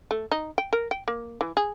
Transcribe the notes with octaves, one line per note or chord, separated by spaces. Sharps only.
A3
D#4
G5
A#4
G5
A#3
E3
G#4